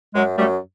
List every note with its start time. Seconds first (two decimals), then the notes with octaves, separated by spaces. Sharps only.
0.15 F#2 F#3 G#3
0.38 F#2 G3 A3